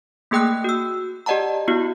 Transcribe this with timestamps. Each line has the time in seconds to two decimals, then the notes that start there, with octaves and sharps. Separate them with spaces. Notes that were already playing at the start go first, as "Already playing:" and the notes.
0.31 A3 A#3 G#4 G5 D#6 F#6
0.64 F#4 E6
1.26 G4 D5 D#5 F#5 A5 A#5
1.68 B3 E4 F#4